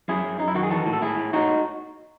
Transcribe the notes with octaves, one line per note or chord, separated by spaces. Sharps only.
F#2 E4 G#4
F#2
F#2 D#4
E4
D#3 F#4
G#4
E3 F#4 A4
A2
A4
A2 E4 G#4
A2
A2 D#4 F#4